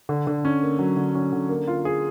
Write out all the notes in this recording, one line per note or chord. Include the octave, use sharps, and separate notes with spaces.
D3
D3
C#4
A#3
F#3
D3
C#4
D3
A#3
F4
G#4